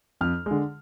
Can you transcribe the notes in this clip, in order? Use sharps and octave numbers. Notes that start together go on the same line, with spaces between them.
F2 F6
D3 G#3